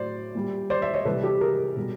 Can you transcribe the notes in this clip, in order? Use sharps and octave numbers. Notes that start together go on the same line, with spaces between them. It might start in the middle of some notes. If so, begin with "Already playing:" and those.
Already playing: A2 F#3 C5 D5
A#2 G3
C5 D5
D5 E5
C#5 D#5
C3 E3 G3 A4 B4
G4 A4
G#4 A#4
B2 G3